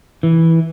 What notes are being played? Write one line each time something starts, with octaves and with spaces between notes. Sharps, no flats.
E3